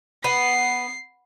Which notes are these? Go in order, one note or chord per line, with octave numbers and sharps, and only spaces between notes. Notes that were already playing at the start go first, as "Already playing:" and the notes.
B3 C7